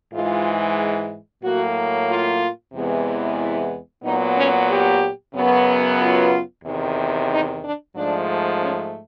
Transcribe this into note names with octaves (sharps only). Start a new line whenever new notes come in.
G#2 E3 G#3 F4
A2 F#3 A#3 F#4
F4
E2 C3 E3 G#3 B3
E4
A#2 F#3 B3 D#4
C#4
G4
F#2 C#3 F#3 B3
F4
E2 C3 D#3
D#4
D4
G#2 F3 A3 D4
C#4